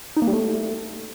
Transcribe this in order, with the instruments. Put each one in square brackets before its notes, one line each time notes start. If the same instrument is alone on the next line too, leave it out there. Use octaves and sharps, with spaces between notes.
[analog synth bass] D#4
A#3
G3
A3